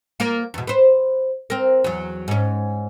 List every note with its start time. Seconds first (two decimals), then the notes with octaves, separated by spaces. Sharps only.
0.20 A#3 F4 A#4
0.54 E2 B2
0.67 B4 C5
1.50 C4 A#4
1.84 E2 F#3
2.28 G#2 C#4